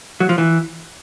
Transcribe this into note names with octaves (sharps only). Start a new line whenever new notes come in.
F#3
F3
E3